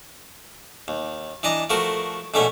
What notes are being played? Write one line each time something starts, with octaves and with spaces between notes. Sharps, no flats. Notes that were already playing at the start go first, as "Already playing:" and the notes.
D#2
E3 D4 D#5 A#5
F3 A3 F#4 A#4
A#1 B2 D3 A3 C#4 E5